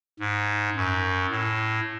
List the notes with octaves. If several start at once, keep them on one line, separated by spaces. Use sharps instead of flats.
G#2
F#2
A2